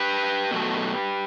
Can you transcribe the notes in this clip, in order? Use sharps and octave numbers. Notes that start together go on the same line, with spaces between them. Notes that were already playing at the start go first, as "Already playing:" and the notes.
Already playing: G4 B4
B2 F#3 A3